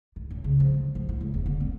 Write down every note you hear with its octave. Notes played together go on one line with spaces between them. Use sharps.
D#3
F#2
C#3
F3
D3
F3
E4
C#2
E1
D3
C4